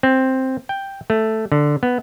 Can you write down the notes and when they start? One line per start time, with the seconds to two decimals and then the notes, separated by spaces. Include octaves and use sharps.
0.03 C4
0.69 G5
1.10 A3
1.52 D3
1.83 B3